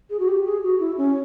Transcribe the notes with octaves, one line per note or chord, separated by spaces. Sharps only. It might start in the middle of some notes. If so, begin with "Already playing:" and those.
G#4
F#4
G4
G#4
F#4
E4
C#4